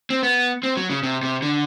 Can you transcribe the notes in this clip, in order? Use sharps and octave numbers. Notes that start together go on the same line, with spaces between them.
C4
B3
C4
F#3
C#3
C3
C3
D3